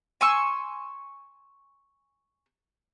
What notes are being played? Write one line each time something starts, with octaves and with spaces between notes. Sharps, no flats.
G#5 C6 C#6 E6